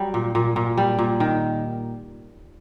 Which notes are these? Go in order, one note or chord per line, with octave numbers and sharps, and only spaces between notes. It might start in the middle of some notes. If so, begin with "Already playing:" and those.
Already playing: F#3 G3
A#2
A#2
A#2
G3
A#2
D#3